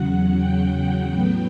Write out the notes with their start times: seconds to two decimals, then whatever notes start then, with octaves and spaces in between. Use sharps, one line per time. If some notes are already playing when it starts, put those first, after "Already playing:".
Already playing: E2 C#3 F#3 F#5
0.37 G5
1.13 A2 F#3 B3